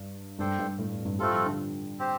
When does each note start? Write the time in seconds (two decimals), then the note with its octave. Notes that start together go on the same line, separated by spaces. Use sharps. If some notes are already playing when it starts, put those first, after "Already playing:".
Already playing: G2
0.39 G2 D4 A4 C5 G5
0.59 G2
0.78 A2
0.93 F2
1.05 G2
1.19 G3 A3 C4 F4 A4
1.32 F3
1.46 D3
1.99 C4 G4 C5